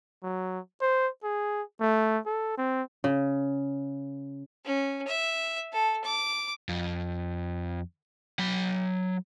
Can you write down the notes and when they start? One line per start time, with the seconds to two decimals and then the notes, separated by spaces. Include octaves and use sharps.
0.23 F#3
0.81 C5
1.23 G#4
1.81 A3
2.26 A4
2.58 C4
3.04 C#3
4.65 C#4
5.07 E5
5.72 A4
6.04 D6
6.69 F2
8.39 F#3 B5